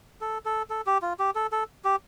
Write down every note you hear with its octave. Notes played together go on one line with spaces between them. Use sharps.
A4
A4
A4
G4
F4
G4
A4
A4
G4